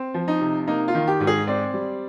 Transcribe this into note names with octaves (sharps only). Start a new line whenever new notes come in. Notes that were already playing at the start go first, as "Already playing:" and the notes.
Already playing: C4
F3
D#4
C3
A#3 D#4
F4
D#3
G4
G#2
G#4
C4 D5
G3